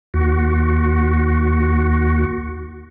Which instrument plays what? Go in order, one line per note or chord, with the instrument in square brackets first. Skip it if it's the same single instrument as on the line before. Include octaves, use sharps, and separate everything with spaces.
[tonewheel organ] D#2 F#4